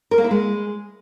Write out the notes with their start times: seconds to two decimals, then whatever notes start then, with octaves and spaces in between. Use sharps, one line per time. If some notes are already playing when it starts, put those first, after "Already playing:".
0.11 A#4
0.18 A#3
0.24 E4
0.31 G#3